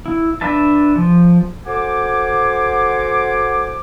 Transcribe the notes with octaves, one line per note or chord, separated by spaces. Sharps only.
E4
D4 B4 E5 A5
F3
F#4 A4 C5 F#5 G#5 D6